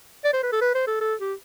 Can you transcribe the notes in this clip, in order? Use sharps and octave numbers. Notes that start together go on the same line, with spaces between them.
D5
C5
B4
A4
B4
C5
A4
A4
G4